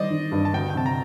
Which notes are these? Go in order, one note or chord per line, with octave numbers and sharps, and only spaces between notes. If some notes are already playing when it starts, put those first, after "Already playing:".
Already playing: D#3 G3 C5 D5 D#5
D#3
G2
A5
D2 G5
G5
C3 A5
A#5